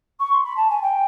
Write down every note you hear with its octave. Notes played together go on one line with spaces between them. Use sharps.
C#6
C6
B5
A5
G#5
G5